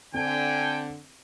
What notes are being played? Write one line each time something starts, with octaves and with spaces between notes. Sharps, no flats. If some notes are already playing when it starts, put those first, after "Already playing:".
D3 C4 G5 G#5